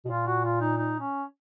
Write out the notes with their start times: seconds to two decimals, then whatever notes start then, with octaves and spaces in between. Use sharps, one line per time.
0.05 B2
0.09 A#2 F4
0.27 F#4
0.44 F4
0.60 D#4
0.77 D#4
1.00 C#4